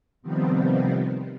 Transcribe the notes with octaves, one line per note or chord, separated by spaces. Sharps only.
C3 D#3 F3 G3 B3 C4